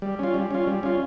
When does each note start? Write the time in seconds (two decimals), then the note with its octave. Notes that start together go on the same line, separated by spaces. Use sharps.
0.02 G3
0.19 C#4 F4
0.34 G3
0.51 C#4 F4
0.67 G3
0.83 C#4 F4